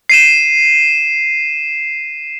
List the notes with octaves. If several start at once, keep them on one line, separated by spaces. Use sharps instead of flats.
C7 D#7 E7